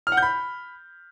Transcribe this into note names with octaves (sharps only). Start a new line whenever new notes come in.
F6
F#5
G6
B5